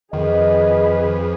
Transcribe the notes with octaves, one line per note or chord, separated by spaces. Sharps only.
F2 D#3 G#4 B4 D#5